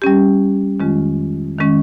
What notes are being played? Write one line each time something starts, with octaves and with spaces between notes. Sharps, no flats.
G3 C#4 G4
F2 D#3 G#3 C#4 F4
D#3 G#3 C#4